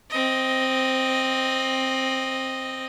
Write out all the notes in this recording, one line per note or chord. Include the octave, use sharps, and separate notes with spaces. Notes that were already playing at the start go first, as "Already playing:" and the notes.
C4 D#5